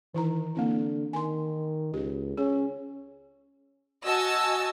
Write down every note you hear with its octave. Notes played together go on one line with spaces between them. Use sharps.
D#3 E3 E4 A#5
D3 A#3 C4 E4
D#3 G#5 C6
C#2 G4
C#4 G#4
F#4 D#5 G#5 A5 E6